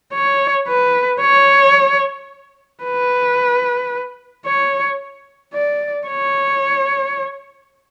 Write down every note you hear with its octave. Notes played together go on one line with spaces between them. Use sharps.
C#5
B4
C#5
B4
C#5
D5
C#5